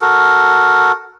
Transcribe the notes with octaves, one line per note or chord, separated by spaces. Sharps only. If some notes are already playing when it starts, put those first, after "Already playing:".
F#4 A4 A#4